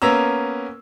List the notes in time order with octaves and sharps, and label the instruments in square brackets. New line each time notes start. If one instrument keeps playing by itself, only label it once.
[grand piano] A#3 B3 C#4 A#5 E6